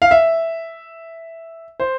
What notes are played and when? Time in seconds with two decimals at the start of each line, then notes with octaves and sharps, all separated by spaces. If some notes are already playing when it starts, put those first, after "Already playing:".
0.02 F5
0.11 E5
1.80 C5